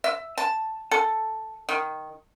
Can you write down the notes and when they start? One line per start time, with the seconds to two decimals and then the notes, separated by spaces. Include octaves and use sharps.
0.04 E5
0.38 A5
0.91 A4
1.69 D#3